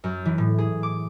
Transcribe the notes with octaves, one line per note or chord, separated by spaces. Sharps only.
F#2
E3
A2
G#4
D6